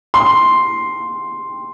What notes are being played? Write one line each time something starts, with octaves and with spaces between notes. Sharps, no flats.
C6